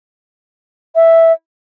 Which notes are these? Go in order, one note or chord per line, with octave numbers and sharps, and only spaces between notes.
E5